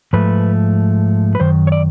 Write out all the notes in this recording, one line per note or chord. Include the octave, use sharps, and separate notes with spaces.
G#2 F3 A3 B4
B4
F#2 D#3 C5
C#5
D5